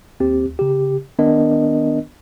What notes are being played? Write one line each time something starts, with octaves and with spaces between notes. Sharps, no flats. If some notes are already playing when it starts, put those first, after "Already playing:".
D#2 C4 G4
D2
C#3 G4
D#3 B3 D4 A#4 D#5